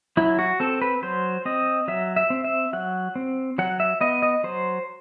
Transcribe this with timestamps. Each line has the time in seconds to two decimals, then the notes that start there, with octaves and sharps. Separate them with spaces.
0.17 F#3 E4
0.39 F#4
0.60 C4 A4
0.82 B4
1.02 F#3 C5
1.45 C4 D#5
1.88 F#3 E5
2.16 E5
2.30 C4
2.44 E5
2.73 F#3 F#5
3.16 C4
3.58 F#3 F#5
3.80 E5
4.01 B3 D#5
4.22 D#5
4.44 F#3 C5